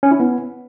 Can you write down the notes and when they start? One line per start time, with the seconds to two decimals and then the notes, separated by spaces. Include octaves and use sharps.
0.03 C#4
0.11 E4
0.20 B3